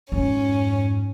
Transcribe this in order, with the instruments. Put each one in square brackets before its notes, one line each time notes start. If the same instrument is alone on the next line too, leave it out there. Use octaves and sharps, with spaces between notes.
[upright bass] F2 G#2 [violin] C#4